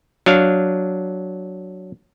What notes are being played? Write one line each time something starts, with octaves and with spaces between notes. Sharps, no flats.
F#3 D4 F5